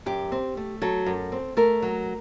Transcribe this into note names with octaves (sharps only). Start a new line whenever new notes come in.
F#2 G4
C4
A3
F#3 A4
F#2
C4
A3 A#4
F#3